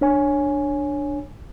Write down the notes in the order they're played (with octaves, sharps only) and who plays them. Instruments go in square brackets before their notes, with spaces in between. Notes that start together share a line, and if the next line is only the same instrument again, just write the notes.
[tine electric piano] D4 C#5 G#5